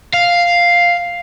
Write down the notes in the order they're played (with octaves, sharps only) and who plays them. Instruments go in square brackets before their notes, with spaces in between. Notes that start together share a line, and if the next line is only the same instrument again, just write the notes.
[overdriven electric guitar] F5